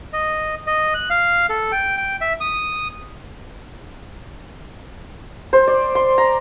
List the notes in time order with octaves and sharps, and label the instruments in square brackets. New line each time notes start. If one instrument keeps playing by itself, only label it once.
[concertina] D#5
D#5
F#6
F5
A4
G5
G5
E5
D#6
[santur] C5
D5
C6
A#5